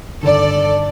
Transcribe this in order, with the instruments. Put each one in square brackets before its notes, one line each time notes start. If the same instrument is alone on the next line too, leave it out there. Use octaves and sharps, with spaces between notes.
[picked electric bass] G2 D3 D#3 [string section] A4 D5